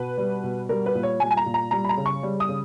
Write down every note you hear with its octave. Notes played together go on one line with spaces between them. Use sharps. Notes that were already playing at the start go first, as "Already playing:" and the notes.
Already playing: B2 B4
G3
B2
G3 A#4
B4
A#2
C#5
G3 G#5
G#5
A#5
A#2
A#5
G3 A#5
B5
A#5
C#3
C#6
G3
D#6
C#3